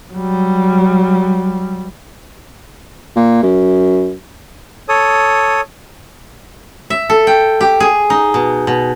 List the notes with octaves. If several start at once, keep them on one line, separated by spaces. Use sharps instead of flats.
F#3 G3
A#2
F#2
A4 C#5 D#6
E5
A4
G5
G4
G#4
D#4
B2
B2